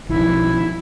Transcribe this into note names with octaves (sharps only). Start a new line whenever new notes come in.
B1 D#3 F3 E4